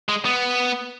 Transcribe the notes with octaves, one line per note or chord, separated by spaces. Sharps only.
G#3
B3